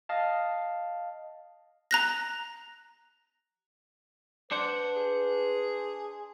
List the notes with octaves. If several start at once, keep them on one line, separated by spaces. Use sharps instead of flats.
D#5 F5 A5
A#5 F#6 A#6
D4 B4 C5 D5 F#5
G#4